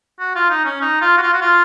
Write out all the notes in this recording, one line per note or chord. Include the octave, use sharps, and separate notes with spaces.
F#4
F4
D#4
C#4
D#4
F4
F#4
F4
F#4
F4